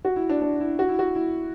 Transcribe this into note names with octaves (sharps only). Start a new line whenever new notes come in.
F#4
E4
D4
D4
E4
F#4
E4
F#4
E4